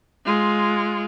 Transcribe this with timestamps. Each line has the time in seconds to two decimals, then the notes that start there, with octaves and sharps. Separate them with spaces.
0.24 G#3 F4